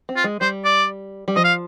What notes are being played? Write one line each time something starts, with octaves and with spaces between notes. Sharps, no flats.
C4
F4
G#3
G3 C5
D5
G3
F3 D#5
F5